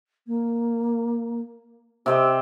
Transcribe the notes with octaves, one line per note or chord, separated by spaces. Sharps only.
A#3
C3 C4 G4 D#5